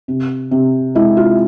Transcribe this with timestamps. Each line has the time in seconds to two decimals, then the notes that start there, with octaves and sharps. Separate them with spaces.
0.08 C3
0.51 C3
0.95 G#3 E4
1.17 F4